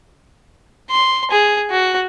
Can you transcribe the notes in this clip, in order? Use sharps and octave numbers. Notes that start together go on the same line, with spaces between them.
C6
G#4
F#4